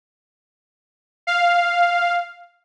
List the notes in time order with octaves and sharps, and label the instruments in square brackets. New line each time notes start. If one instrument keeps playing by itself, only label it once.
[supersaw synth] F5